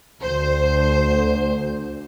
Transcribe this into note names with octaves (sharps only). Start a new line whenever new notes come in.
D2 C5